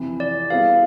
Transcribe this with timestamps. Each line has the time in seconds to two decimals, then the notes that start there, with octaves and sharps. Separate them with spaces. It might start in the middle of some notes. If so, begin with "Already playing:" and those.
Already playing: F2 C3 E3
0.20 D5
0.50 G3 B3 E4 G#4 B4 F5